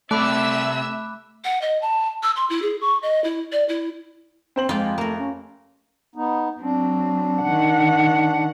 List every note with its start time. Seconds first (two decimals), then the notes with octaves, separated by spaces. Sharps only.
0.11 C3 A3 D5 E5 B5 D6 E6 F#6
1.45 F#5
1.62 D#5
1.82 A5
2.23 E6
2.36 C6
2.50 E4
2.62 G#4
2.81 C#6
3.03 D#5
3.24 E4
3.52 D5
3.69 E4
4.56 C4 C5 F#7
4.69 F2 G#3 F4 G4
4.98 A3 A#3 A#4
5.18 C#4
6.16 B3 D#4
6.61 F#3 C4 D4
7.42 D#3 F#5